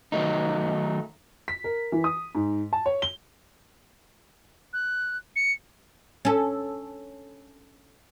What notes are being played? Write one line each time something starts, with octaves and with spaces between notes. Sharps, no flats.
D#3 F#3 A3 D#4
B6
A#4
E3
D#6
G#2
A5
C#5
G7
F#6
C#7
C#4 A4